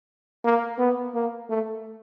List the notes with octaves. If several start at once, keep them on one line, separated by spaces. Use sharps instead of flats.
A#3
B3
A#3
A3